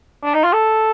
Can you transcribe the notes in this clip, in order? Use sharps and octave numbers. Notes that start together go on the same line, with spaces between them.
D4
D#4
F4
A4